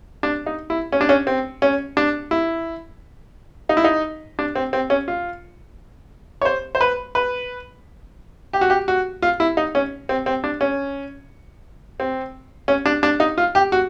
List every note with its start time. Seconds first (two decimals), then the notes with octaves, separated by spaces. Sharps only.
0.23 D4
0.46 D#4
0.70 E4
0.92 C#4
1.01 D4
1.09 C#4
1.27 C4
1.62 C#4
1.97 D4
2.31 E4
3.69 D#4
3.77 E4
3.84 D#4
4.39 D4
4.55 C4
4.73 C4
4.90 C#4
5.08 F4
6.42 C#5
6.45 C5
6.75 C5
6.81 B4
7.15 B4
8.53 G4
8.61 F#4
8.70 G4
8.88 F#4
9.22 F4
9.40 E4
9.57 D#4
9.75 C#4
10.09 C4
10.26 C4
10.44 D4
10.61 C#4
12.00 C4
12.68 C#4
12.86 D4
13.03 D4
13.20 D#4
13.38 F4
13.55 G4
13.72 F#4